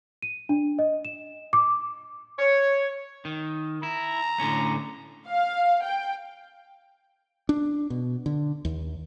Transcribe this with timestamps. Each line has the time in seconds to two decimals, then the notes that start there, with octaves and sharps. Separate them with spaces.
0.22 D#7
0.49 D4
0.79 D#5
1.05 E7
1.53 D6
2.39 C#5
3.25 D#3
3.83 E4 A#5
4.40 A2 D3 C#4
5.27 F5
5.83 G5
7.49 D4
7.90 B2
8.26 D3
8.65 D#2